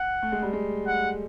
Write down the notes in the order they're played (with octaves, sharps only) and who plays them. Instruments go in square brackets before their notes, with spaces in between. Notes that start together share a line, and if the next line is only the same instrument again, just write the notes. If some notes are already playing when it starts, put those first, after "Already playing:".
Already playing: [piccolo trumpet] F#5
[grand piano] A3
G#3
G3
G#3
[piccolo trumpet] F#5